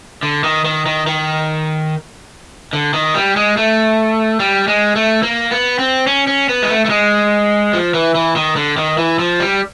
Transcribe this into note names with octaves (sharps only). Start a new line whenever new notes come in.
D3
D#3
D#3
D#3
D#3
D3
D#3
G3
G#3
A3
G3
G#3
A3
A#3
B3
C4
C#4
C#4
B3
G#3
A3
A3
G#3
F3
E3
E3
D#3
D3
D#3
E3
F3
G3